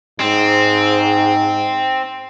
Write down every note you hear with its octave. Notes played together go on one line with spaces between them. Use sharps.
G#2 C4